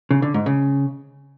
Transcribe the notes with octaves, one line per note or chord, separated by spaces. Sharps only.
C#3
D3
G#2
C#3